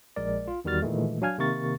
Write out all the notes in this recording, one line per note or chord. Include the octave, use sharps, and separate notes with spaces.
A#1 G#3 A#4 D5
F4
E2 D#3 G3 F#4 F6 A6
A#2 D#3 E3 G#3 A3
F#3 D4 F5 G#5 F6 G#6
C3 D#3 A#3 A#4 C#6 A6